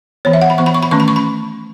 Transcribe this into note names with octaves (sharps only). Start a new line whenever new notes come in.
E3 B3 C#5
E5
F#5
B5
E3 B3 C#6
B5
C#6
B5
D#3 A3 C#4 C#6
B5
C#6
B5